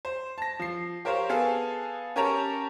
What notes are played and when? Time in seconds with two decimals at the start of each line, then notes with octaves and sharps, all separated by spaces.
0.05 C5
0.38 A5 A#6
0.59 F3 C7
1.05 G4 A#4 C5 C#5 F5
1.29 B3 G#4 A4 F5 A5
2.16 C#4 G4 A#4 C#5 A5 A#5